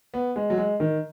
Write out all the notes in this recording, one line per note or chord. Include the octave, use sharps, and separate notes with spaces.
B3
G#3
F#3
G#3
D#3